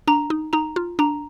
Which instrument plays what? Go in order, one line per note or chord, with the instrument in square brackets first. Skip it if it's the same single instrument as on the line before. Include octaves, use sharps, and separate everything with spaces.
[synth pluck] D4 [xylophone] A#5
[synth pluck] D#4
[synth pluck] D#4 [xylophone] A#5
[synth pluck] F4
[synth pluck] D4 [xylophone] A#5